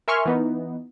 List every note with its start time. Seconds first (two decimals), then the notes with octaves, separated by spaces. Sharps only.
0.08 A#4 E5 G#5 C6 C#6 F6
0.25 E3 B3 D#4